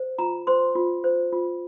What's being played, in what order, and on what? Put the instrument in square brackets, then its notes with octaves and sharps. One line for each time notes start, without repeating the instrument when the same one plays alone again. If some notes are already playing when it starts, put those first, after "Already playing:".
Already playing: [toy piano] C5
F4 A#5
C5 C6
F4
C5
F4